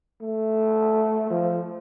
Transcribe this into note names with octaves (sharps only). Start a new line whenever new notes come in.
A3
F3